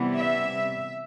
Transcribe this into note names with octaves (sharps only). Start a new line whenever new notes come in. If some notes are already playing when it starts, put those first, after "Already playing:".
Already playing: C3 E3 G3 B3
E5